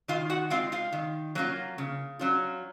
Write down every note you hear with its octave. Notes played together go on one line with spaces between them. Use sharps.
D#3 F4 F5
F#4 F#5
G#3 C4 F4 F5
F4 F5
D#3
F#3 A#3 C#4 F4
C#3
F#3 C#4 F4